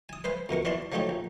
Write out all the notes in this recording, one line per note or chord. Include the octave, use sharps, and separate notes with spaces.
G#5 D#6
B4 C5 F5 G#5
F2 B2 A#4 C#6
E3 F#4 D5 F5 A5 C6
F3 F#3 A3 D#4 G4 C#5
A#1